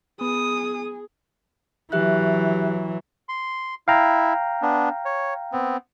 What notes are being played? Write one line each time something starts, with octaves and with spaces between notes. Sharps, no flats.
B3 G#4 D#6
E3 F#3 G4 E5 F#6
C6
E4 F5 G5 A#5
B3 D4
C#5
B3 C4